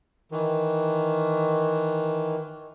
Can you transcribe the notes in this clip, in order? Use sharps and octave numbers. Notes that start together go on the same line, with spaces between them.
D#3 E3